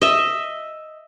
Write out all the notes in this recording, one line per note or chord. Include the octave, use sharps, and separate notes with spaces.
D#5 E5